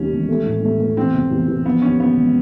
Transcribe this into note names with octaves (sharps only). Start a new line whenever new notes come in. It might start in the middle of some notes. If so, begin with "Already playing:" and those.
Already playing: D#2 D#3 G3 C#4
E1
A3
A2
A3
A3
E2 C4
F1
E2
E2
F3 B3
D#2 C#4
D#2 B3
E1